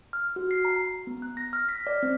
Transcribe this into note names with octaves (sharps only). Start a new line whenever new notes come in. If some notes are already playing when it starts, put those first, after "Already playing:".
F6
F#4
C7
A#5
B3
F#6
A#6
F6
B6
D5
C4